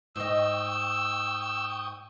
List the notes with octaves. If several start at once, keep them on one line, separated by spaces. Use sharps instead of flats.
G#2 D#5 G5 C#6 D#6 E6